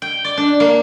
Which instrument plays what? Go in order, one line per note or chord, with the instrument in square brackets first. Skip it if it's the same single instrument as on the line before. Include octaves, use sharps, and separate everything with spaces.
[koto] G5
D5
D4
A#3